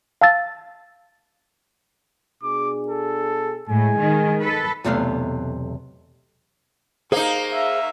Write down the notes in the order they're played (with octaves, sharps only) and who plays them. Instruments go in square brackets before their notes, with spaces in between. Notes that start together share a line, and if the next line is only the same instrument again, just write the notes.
[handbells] F5 A5 E6 A6
[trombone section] B2 D4 G#4 [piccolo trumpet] D6
[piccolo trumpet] A4
[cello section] A2 [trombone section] G#3 [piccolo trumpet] G#5
[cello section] D#3
A4 B4
[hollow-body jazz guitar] B1 E2 C3 A3 B3 F5
[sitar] A#3 D#4 [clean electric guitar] G#4 C5 F5 [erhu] A#5
[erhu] E5